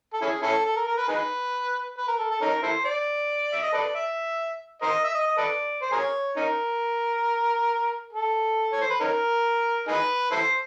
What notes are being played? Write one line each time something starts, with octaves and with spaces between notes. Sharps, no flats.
A4
C#4 E4 G#4
C#4 E4 A4
A4
A#4
A#4
B4
D#4 G#4 B4
B4
A#4
A4
A4
C#4 D#4 A#4
E4 A4 C5
D5
E5
D#5
A4 B4 D5
E5
A#4 C5 D#5
E5
D#5
D#5
A4 B4 D5
C5
G#4 A#4 C#5
C#4 D#4 A#4
A4
C#5
C5
B4
C#4 D#4 A#4
D#4 G#4 B4
E4 A4 C5